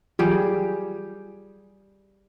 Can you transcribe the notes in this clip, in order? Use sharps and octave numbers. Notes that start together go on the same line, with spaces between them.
E3 F#3 G3 F4 G4 G#4